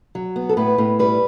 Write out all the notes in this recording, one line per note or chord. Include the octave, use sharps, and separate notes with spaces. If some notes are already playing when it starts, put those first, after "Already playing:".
F#3
B3
A4
A2 B4
A2
G3 B4